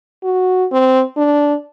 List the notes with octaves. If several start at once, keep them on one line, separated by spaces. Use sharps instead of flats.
F#4
C4
D4